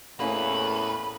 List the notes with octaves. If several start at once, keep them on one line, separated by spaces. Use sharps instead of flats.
E2 A2 A#3 C#4 B4